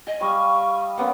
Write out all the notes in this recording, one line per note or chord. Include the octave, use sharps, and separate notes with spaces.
D#5 G#5
G3 D#5 F5 C#6
A#3 B3 C#4 F#5